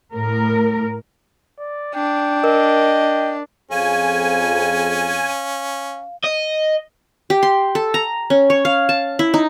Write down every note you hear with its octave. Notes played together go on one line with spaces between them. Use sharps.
A2 A#4
D5
D4 G5
A#4 D#5
F2 C#4 G#4 F5 G#5
D#5
G4
C6
A4
A#5
C#4
C#5
F5
A5
E4
D#4